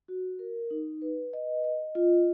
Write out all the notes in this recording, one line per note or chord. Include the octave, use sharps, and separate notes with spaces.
F#4
A#4
D#4
B4
D#5
D#5
F4